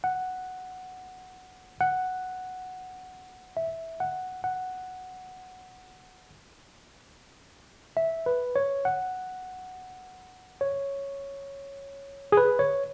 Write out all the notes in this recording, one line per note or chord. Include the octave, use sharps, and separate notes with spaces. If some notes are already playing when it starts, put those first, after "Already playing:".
F#5
F#5
E5
F#5
F#5
E5
B4
C#5
F#5
C#5
G#4
B4
C#5